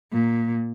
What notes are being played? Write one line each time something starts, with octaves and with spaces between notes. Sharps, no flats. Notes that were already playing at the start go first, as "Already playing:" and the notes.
A#2